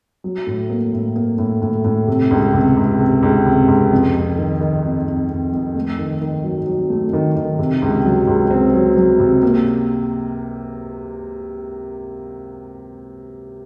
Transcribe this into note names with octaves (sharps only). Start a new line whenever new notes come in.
F#3
A2
A#3
A2
A#3
A2
A2
A2
C3
C#2
C3
C#2
C3
C#2
C3
C#2
F2
F2
D#3
D#3
F2
F2
F2
F2
A3
D#3
D#3
F#3
F#3
A3
D#3
D#3
C3
C#2
F#3
C#2
C4
F#3
F#3
C3
A#3